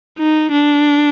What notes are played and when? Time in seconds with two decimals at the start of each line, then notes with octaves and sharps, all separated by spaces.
0.19 D#4
0.52 D4